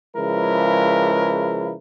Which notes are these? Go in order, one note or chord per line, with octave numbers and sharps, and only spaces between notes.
C#3 F3 G#3 E4 A#4 B4